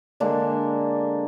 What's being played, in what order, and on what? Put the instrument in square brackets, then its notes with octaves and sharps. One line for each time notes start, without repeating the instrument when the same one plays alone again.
[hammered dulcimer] D3 G#3 A#3 D4